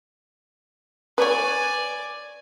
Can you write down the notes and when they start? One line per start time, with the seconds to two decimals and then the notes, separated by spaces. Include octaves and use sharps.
1.18 B4 C#5 D5 G#5